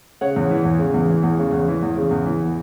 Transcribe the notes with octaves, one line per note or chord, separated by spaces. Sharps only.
C#3 C#5 F#5
E2
E3
E2
C#3
E2
E3
E2
C#3
E2
E3
E2
C#3
E2
E3